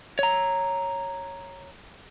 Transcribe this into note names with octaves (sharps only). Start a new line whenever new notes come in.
C#5 A#5